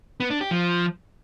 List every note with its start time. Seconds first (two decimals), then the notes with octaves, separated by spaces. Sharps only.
0.20 B3
0.31 D4
0.41 G4
0.51 F3